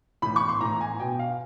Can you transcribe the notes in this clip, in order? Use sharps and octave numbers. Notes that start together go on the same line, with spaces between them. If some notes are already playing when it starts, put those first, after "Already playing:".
A2 E3 B5
C#6
C6
A2 E3 A#5
G#5
B2 G5
F5